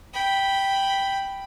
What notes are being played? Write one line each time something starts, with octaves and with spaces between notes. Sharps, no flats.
G5 B5